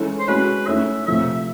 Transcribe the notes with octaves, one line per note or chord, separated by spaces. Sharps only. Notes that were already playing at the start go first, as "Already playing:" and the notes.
Already playing: E3 G#3 C#4 E4 A4
C5
G#3 C#4 F#4 A4 B4
A3 C#4 E4 E5
C3 F3 A3 E5